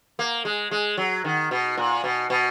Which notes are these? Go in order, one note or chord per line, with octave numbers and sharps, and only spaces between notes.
A#3
G#3
G#3
F#3
D#3
B2
A#2
B2
B2